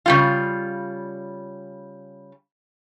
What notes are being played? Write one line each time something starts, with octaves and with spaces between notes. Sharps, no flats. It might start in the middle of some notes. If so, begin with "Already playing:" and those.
C#3 G3 F4